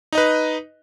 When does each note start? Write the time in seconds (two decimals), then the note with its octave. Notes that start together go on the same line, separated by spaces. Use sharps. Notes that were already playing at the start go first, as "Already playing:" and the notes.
0.12 D#4
0.15 D#5
0.18 B4